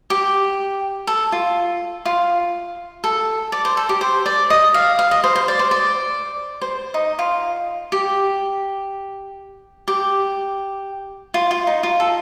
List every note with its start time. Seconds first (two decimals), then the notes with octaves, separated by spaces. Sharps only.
0.10 G4
1.07 A4
1.32 F4
2.06 F4
3.04 A4
3.52 D5
3.65 C5
3.77 A4
3.89 G4
4.01 C5
4.26 D5
4.50 D#5
4.74 F5
4.99 F5
5.11 D#5
5.24 C5
5.36 C5
5.48 D5
5.59 C5
5.71 D5
6.61 C5
6.94 D#4
7.19 F4
7.92 G4
9.88 G4
11.34 F4
11.51 F4
11.67 D#4
11.83 F4
12.00 A4